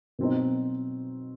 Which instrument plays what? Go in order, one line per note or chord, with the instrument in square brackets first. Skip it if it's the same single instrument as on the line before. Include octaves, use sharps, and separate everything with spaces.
[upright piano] B2 F#3 C4 D#4